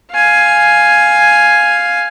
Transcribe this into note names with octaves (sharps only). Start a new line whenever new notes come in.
F5 G#5